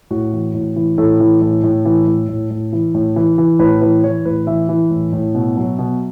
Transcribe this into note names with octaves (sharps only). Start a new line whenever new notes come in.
A2 F#4
E3
A2
E3
A2 A4
E3
A2
A2
E3
A2
A2
A2
E3
A2
E3
E3
A2 B4
E3 B4
E3 C#5
A2 B4
E3 E5
E3
A2
A2
B2
F#3
B2